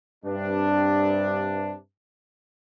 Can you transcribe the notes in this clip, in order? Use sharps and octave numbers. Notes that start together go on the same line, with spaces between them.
G2 C3 D4